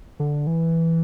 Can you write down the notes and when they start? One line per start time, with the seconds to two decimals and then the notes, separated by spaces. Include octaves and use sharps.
0.20 D3
0.47 E3